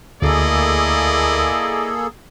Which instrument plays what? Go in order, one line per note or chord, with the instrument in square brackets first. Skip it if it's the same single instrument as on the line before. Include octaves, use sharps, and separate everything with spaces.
[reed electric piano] D2 [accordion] A#3 G#4 A4 [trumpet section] E4 D5 D#5